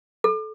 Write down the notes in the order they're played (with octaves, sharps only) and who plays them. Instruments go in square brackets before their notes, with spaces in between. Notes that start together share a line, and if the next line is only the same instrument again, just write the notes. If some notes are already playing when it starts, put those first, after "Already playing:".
[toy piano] A4